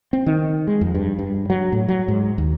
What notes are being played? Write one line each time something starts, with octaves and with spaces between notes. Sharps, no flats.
C4
D#3
G#3
F2
G2
G2
F#3
A2
F#3
G#2
D#2